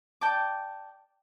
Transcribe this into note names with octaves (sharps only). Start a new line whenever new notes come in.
D5 G5 A5 D6